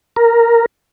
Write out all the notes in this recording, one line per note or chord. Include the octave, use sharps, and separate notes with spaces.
A#4